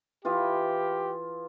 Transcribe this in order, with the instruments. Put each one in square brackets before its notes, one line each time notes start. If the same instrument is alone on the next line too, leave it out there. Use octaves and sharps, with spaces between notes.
[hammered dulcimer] E3 F4 G#4 [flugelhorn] G4